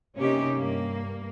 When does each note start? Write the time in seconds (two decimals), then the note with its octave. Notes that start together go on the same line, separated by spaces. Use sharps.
0.17 C3 A#3 C#4 D#4 G4
0.56 G2 A#3